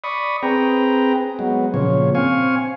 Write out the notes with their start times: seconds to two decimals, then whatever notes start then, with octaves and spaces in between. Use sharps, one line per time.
0.04 D5 B5 C#6 D#6
0.43 C4 G#4 B4 G5 A#5
1.39 F#3 G#3 B3
1.74 A#2 C#3 F3 C#5
2.15 C4 F5 G#5 C#6